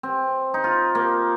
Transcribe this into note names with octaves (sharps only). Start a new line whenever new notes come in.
C4
D#4
F4
A#3